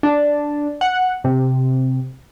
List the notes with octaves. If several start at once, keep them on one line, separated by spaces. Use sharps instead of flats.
D4
F#5
C3